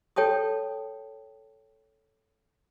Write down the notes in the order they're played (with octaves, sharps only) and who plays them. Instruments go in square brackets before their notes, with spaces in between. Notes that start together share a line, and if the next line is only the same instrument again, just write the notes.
[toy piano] A4 C#5 G5 A5 D#6